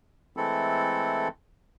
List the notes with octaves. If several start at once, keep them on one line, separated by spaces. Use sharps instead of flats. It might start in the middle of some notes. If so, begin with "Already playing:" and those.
E3 G#3 A3 C4 E4 A4